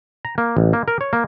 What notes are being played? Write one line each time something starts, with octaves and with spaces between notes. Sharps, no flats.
A#5
A#3
A1
A#3
A#4
C#5
A#3